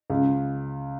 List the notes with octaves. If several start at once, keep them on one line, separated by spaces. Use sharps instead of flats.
C#2